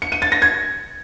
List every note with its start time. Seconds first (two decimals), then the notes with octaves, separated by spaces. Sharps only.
0.02 C#7
0.12 D#7
0.22 A6
0.32 A#6
0.42 G#6